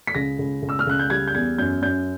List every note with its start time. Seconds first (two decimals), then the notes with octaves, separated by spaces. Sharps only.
0.07 B6
0.15 C#2 A#6
0.39 C#2
0.62 C#2
0.69 E6
0.79 F6
0.87 C#2 F#6
0.99 G6
1.10 G3 G#6
1.27 G6
1.35 E2 G#6
1.58 F#2 G6
1.82 F#2 G6